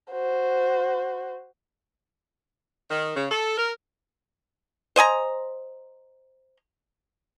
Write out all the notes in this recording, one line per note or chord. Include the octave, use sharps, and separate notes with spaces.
F#4 C5
D#3
C#3
A4
A#4
C5 D#5 G#5 A#5